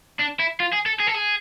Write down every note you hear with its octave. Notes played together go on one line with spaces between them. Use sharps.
D4
E4
F4
G#4
A4
G#4
A4
G#4